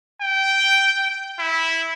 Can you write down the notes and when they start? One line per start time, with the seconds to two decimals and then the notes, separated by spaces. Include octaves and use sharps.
0.21 G5
1.39 E4